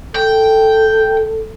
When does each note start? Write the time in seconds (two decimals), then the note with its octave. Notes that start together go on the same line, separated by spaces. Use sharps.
0.16 A4 G5